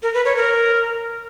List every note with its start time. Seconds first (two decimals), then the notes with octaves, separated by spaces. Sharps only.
0.03 A#4
0.14 B4
0.25 C#5
0.37 A#4